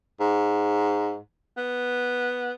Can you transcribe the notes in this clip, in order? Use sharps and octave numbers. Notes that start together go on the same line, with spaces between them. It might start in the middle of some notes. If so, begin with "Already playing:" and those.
G#2
B3